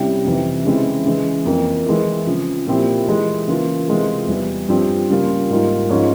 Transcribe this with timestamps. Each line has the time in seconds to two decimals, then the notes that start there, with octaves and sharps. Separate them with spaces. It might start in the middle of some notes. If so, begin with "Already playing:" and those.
Already playing: C3 G3 C#4 E4 G4
0.25 F2 C3 E3
0.65 C#3 E3 G#3 C4 E4
1.06 C#3 E3 G#3
1.45 F2 E3 A#3
1.86 E3 G#3 E4
2.27 C#3 F3 C4
2.67 A#2 F3 C4 E4 G4
3.07 E3 G#3 E4
3.48 C#3 E3 A#3 F4
3.88 C3 E3 G#3 C4 F4
4.28 E2 E3 G3
4.68 G2 F3 C4
5.09 C#3 G3 A#3 F4
5.50 G#2 G3 A#3 F4
5.90 G#2 F3 G#3 C#4 F4